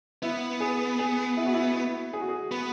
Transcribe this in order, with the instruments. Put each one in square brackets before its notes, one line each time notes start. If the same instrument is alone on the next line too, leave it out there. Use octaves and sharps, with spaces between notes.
[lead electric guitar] B3 [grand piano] E4
[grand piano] G#4
G#4
E4
F#4
E4
E4
G#4
F#4
G#4
[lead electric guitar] B3